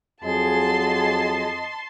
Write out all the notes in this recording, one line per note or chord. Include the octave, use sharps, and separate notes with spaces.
F2 F#3 G#4 D#5 A5 C6